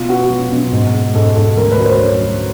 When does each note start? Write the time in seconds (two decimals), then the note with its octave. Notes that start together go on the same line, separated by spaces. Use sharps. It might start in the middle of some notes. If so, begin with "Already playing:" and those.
Already playing: B2 F4
0.09 B3 F#4
0.30 F#3
0.52 B2
0.72 G#2
0.94 G#3
1.15 G#2 A4
1.36 G#2 A4
1.57 D2 A#4
1.72 B4
1.79 F#3
1.86 C5
1.99 D3 C#5
2.21 F#3